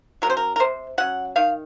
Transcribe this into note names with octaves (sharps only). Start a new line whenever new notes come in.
F#3 C#4 A#4 C5
A#4
A#4
C3 C5
F#3 C#4 F#5
D#3 F5